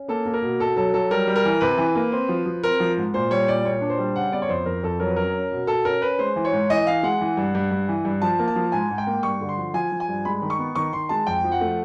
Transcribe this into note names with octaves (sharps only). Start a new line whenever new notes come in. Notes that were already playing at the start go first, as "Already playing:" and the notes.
Already playing: C#4
A#3 A4
A#3
A#4
B2
B2 A4
F#3 A4
F#3 A4
G3 A#4
G3
A#4
E3
C3 B4
E3
A#3
C4
F3
F3
C4 A#4
F3
G#2
A#2 C5
G3 C#5
A#2 D5
A#2 C#5
D4
C5
G3
C#3 F#5
B3 D5
C#5
F2 C5
F2 A#4
F2 A4
F#3 A#4
B4
C#4 A#4
C#4
B2
B2 A4
C#4 A#4
C#4 B4
G#3 C5
E3
C#5
G#2
E3 D#5
E3 F5
G#3 F#5
E3
G2
G2
G2
E3
G2
F3 A5
A#3
A5
F3
G#2 G#5
G#2
G5
A#3
G2 C#6
D3
C6
F3
F3 G#5
F3
G#5
G2
G#3 B5
D#3
C#6
B3
D#3 C#6
D#3 C6
G#3 A5
F2 G5
F3
F#5
A3